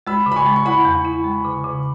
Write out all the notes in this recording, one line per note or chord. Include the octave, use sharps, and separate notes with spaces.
G#3 B5 E6
C#3
B5
G#5 C#6
G#3
C#6
E4 F#5 B5
E2
E4
G#3
C#3
C#3